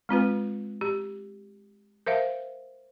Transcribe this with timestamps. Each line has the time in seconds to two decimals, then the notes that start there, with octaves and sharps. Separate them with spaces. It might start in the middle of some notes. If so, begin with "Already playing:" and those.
0.09 G#3 C4 F4 B4
0.81 G4
2.06 A#4 C5 E5 F5